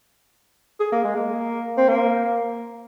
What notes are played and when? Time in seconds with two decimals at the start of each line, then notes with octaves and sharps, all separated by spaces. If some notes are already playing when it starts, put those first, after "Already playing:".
0.80 G#4
0.92 A#3
1.04 G#3
1.16 A#3
1.78 C4
1.88 A#3